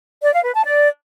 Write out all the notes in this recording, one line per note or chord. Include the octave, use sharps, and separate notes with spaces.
D5
F5
B4
A5
D5